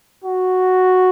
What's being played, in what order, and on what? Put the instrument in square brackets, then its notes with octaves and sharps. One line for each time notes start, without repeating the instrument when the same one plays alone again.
[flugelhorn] F#4